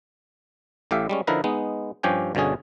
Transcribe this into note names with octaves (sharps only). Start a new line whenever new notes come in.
A1 A2 G4 E5 F5
G3 G#3 C#4
D3 F3 D#4 E4 A#4 B4
G#3 B3 D#4
G2 F3 C#4 G4 G5 G#5
G1 B2 D3 C#4 G#4